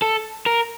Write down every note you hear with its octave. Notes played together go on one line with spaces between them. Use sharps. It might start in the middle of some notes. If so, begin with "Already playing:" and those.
A4
A#4